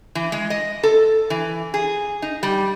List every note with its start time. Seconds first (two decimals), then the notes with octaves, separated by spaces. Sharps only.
0.15 E3
0.32 G#3
0.50 D#5
0.83 A4
1.30 E3
1.74 G#4
2.22 D#4
2.43 G3